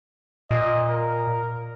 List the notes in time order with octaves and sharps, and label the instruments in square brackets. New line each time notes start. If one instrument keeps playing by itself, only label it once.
[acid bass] A#2 [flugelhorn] D#5
[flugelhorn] A#4